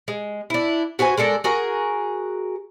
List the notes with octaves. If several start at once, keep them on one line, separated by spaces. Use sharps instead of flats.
G#3
D4 E4
F#4 B4 C5 G#5
G#3 D4 A4 A#4
F#4 G#4 A#4